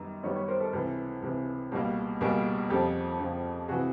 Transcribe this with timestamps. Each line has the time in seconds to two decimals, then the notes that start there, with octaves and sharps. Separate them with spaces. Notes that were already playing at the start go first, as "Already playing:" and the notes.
Already playing: F#2 D#3 G3 B3 D#5
0.23 F#2 D#3 G3 B3 C#5 D#5
0.36 B4 C#5
0.48 A#4 C5
0.60 A4 B4
0.73 C#2 C3 E3 A4 B4
1.22 C#2 C3 E3
1.72 C#2 B2 G3 A#3
2.21 C#2 B2 G3 A#3 G#4 A#4
2.70 F2 C#3 F3 G4 A4
3.20 F2 C#3 F3
3.68 C3 E3 F#4 G#4